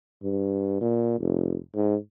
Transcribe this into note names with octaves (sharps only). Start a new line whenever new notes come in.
G2
A#2
F1
G#2